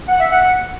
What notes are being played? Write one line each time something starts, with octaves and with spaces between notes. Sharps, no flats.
F#5
E5
F#5